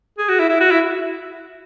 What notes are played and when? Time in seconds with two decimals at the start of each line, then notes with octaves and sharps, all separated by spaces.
0.18 G#4
0.29 F#4
0.39 E4
0.49 E4
0.61 F#4
0.71 E4